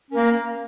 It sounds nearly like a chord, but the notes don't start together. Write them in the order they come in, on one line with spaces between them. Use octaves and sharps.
C#4 A#4 A#3